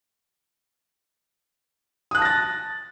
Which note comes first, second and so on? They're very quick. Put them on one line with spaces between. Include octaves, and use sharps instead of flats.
D#6 F#6 A5 A#6 A6